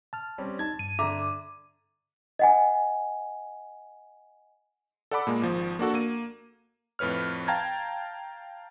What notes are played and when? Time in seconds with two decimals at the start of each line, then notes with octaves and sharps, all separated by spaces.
0.13 A5 F6
0.38 G3 C4 C#4
0.59 D#4 A5 G#6
0.79 G2 D#7
0.99 D3 E5 A#5 D6
2.39 D#5 F#5 G#5
5.11 A4 D5 F#5 A5 B5 D6
5.27 A#2 G#3 A#3
5.42 G#1 F3
5.79 A#3 D4 F#4 A4
5.94 A#3 D#7
6.99 F2 A2 B4 C#5 F6
7.48 F5 G5 A5 A#5 G#6